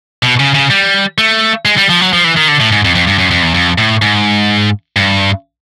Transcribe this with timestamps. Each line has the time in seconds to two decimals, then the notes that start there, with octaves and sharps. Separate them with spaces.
0.23 B2
0.40 C#3
0.54 C#3
0.70 G3
1.18 A3
1.65 G#3
1.78 G3
1.89 F3
2.01 F#3
2.13 F3
2.24 E3
2.36 D#3
2.48 D3
2.60 A2
2.72 G#2
2.84 F2
2.95 F2
3.07 G2
3.19 F#2
3.31 F2
3.42 E2
3.54 F2
3.78 A2
4.02 G#2
4.96 G2